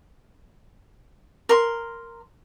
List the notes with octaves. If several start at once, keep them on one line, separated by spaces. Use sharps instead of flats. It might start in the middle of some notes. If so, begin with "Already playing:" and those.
A#4 C6